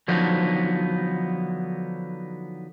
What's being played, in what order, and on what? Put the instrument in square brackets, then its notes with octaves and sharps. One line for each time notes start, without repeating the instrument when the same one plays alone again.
[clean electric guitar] D3 F3 F#3 B3 D#4